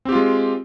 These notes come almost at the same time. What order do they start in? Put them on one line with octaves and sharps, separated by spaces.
C4 G4 F4 G#3